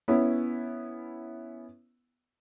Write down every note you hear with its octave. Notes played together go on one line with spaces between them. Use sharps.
B3 C#4 E4